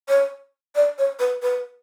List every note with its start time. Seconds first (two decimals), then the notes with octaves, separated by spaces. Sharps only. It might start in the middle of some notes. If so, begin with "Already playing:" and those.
0.08 C#5
0.75 D5
0.98 C#5
1.19 B4
1.42 B4